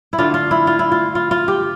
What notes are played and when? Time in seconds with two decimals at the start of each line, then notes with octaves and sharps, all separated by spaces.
0.13 E4
0.18 D3 A3 D4 F4
0.34 F4
0.51 E4
0.67 F4
0.79 E4
0.92 F4
1.15 F4
1.31 F4
1.48 G4